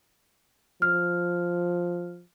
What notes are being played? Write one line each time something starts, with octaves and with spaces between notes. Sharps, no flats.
F3 F6